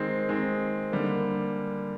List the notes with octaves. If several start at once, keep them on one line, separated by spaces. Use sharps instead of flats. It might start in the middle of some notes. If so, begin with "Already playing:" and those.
Already playing: D#3 G#3 C4
D#3 G#3 C4
D3 G3 A#3